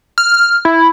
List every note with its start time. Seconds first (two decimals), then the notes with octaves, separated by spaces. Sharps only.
0.18 F6
0.65 E4